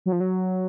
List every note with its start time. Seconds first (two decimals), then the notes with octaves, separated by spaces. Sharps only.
0.06 F#3
0.12 F3
0.20 F#3